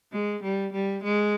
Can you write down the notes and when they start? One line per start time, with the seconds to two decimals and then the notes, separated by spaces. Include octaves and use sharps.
0.12 G#3
0.43 G3
0.73 G3
1.04 G#3